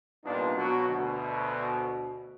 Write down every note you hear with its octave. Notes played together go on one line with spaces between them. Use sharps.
C2 A#2 B3 D4 D#4 F4
B2 F#3 F#4
D2 B2